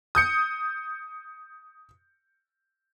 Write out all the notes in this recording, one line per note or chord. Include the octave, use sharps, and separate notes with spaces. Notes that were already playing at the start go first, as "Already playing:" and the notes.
D#6 G6 C#7